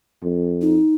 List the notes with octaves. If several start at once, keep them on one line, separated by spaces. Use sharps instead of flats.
F2
D#4